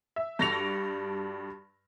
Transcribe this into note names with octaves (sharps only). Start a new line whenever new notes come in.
E5
G2 G3 F#4 A4 A#6 F7